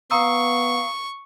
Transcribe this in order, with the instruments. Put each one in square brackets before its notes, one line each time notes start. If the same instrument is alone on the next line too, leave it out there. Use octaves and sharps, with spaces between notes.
[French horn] B3 [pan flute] F5 [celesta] A#5 D#6 E6 [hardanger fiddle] C#6